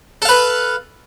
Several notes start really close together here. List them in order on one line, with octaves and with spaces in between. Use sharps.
A4 F5 B4